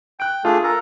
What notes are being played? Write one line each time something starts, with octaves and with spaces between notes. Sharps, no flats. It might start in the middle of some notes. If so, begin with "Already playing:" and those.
G5 F#6 D7
A3 D4 F4 G#4
A4 A#4